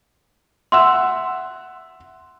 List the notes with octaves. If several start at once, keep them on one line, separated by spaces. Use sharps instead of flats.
E5 F#5 C6 E6